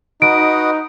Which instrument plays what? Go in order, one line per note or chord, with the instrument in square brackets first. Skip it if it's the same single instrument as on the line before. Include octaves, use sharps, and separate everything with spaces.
[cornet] D#4 [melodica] F#4 B4 D#5 [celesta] D7